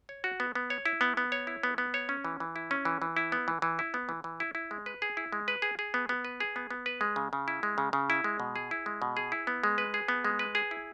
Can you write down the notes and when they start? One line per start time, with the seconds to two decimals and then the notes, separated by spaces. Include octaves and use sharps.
0.09 C#5
0.24 F#4
0.40 B3
0.55 B3
0.70 C#5
0.86 E4
1.01 B3
1.17 B3
1.32 C#5
1.47 E4
1.63 B3
1.78 B3
1.94 C#5
2.09 C#4
2.25 E3
2.40 E3
2.56 E4
2.71 C#4
2.85 E3
3.02 E3
3.17 E4
3.32 B3
3.48 E3
3.62 E3
3.79 E4
3.94 B3
4.09 E3
4.24 E3
4.40 E4
4.55 E4
4.71 G#3
4.86 B4
5.02 G#4
5.17 E4
5.32 G#3
5.48 B4
5.62 G#4
5.79 G#4
5.94 B3
6.09 B3
6.25 B4
6.40 G#4
6.56 B3
6.71 B3
6.86 B4
7.01 G#3
7.16 C#3
7.33 C#3
7.48 E4
7.63 G#3
7.78 C#3
7.93 C#3
8.10 E4
8.24 G#3
8.40 B2
8.56 G#4
8.71 E4
8.86 G#3
9.02 B2
9.17 G#4
9.32 E4
9.47 B3
9.64 G#3
9.78 B4
9.94 G#4
10.08 B3
10.25 G#3
10.39 B4
10.55 G#4
10.71 E4